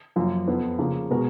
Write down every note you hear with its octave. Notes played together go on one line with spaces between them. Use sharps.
F#2 F3 A#3 F4
F2 F3 B3
C#3 F3 A#3
B2 G#3 B3 F#4 A#4